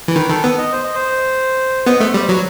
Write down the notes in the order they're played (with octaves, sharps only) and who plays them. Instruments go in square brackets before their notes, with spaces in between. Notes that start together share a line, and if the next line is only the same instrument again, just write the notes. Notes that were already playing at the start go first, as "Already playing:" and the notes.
[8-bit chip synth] E3
[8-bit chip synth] D#3 [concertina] B4
[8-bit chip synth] D#3 [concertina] A4
[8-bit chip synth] B3
[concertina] D#5
C5
D#5
C5
[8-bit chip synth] B3 [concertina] D#5
[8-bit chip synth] A3 [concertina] C5
[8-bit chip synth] G3 [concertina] C5
[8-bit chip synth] F#3 [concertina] B4